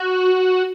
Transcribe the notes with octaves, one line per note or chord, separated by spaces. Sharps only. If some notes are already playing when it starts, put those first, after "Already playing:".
Already playing: F#4